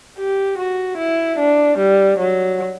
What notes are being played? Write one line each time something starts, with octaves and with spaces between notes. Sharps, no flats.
G4
F#4
E4
D4
G3
F#3